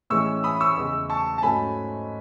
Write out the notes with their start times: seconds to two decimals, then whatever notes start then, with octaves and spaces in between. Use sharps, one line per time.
0.10 A2 E3 G#3 C#4 C#6 E6
0.44 B5 D#6
0.61 C#6 E6
0.77 E2 C#3 G#3
1.10 A5 C#6
1.38 A5
1.42 G#2 F#3 A3 C#4 G#5 B5